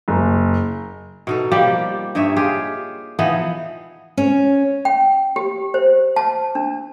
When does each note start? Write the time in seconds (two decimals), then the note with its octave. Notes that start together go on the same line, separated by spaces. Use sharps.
0.08 F#1
1.27 B2 D#4 A4
1.52 F3 G3 A#3 G4
2.15 G2 D#4 C#5 E5
2.36 F4 G4 G#4
3.19 E3 F3 B3 D#4
4.17 C#4
4.85 G5
5.36 G4
5.74 C5
6.16 A5
6.55 D4